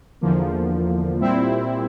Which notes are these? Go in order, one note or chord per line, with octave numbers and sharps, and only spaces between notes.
E2 D3 F3 A#3
A#2 G3 C4 E4